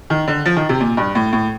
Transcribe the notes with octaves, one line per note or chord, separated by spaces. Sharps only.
D#3
D3
F3
D#3
C3
A#2
G2
A2
A2